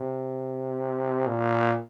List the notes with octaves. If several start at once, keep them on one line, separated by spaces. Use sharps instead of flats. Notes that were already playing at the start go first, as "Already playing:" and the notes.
Already playing: C3
A#2